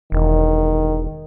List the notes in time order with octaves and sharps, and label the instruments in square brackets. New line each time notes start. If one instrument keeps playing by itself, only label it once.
[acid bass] E1 [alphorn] D#3